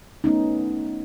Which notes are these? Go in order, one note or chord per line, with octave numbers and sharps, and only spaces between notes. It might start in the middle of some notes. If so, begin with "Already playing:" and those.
A3 B3 C#4 D#4